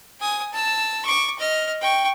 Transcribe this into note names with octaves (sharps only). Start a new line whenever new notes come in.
G#5 D#6
A5 E6
C#6 D6
D#5 F6
G5 C#6